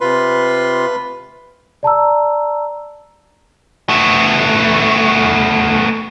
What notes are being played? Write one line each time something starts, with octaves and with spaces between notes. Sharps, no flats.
C3 F4 B4 C6
D5 A5 A#5 E6
A3 B3